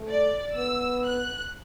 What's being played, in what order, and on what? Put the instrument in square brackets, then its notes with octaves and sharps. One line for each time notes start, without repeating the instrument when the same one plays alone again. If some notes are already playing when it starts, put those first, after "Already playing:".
Already playing: [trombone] A3
[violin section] D5
[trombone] B3 [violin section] E6
[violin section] F#6